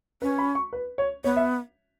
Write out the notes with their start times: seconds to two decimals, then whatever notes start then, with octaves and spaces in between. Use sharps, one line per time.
0.22 C#4 B4
0.38 B5
0.55 C#6
0.73 B4
0.98 C#5
1.24 B3 C#5
1.36 E5